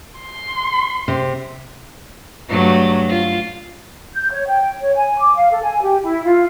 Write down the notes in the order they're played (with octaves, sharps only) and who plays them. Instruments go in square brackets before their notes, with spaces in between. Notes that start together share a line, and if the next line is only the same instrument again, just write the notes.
[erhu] C6
[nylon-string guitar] C3
[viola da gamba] G2 F#3 A3
F4
[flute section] G6
C#5
G5
C#5
G#5
D6
F5
A4
G#5
G4
E4
F4